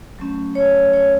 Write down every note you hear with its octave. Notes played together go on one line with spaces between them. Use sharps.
F#3 A3 C#4
C#5
C#5